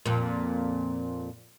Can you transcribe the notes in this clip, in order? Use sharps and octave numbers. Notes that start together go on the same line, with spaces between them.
F2 A#2